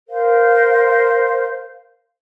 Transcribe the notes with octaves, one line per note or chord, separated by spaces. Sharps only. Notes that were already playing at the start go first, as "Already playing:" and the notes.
A#4 C5 F5